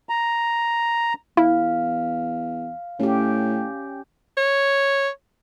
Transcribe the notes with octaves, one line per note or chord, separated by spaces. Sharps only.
A#5
E2 E4 F5
A2 C#4 G4
C#5